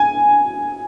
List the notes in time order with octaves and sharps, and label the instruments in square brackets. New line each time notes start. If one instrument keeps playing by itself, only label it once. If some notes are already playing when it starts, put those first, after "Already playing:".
Already playing: [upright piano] G#5